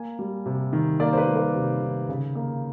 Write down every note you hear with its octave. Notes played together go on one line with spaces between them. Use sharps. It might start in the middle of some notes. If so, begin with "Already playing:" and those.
Already playing: A#3 G#5
G3
C3
D#3
A#3 D5
C5
B4
G3
B4
C3
D#3
C#3
A#3